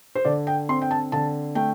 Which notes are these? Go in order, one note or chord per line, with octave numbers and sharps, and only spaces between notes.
C5
D3 D5
G5
C4 C6
G5
A5
D3 A5
A3 G5